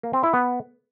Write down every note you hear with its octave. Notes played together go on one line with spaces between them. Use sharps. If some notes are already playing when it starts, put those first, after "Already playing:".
A#3
C4
E4
B3